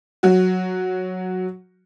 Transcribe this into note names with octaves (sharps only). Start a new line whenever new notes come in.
F#3 F#4